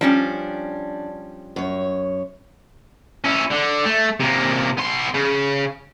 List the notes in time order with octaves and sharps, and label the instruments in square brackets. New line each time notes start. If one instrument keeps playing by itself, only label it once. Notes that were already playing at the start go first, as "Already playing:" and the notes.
[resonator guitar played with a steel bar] F3 G3 C#4 [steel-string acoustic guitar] D4
[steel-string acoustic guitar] F#2 C#5
[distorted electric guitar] C#4 E4
D3
A3
C3 A#3
B3 C6
C#3